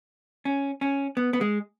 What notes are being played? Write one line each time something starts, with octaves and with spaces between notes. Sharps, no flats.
C#4
C#4
B3
B3
G#3